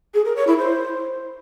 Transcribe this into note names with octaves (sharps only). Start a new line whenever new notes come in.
G#4
A#4
C#5
E4
C5